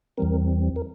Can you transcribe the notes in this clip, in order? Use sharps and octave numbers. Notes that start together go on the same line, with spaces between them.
E2 E3 G3 C4 A#4
A#4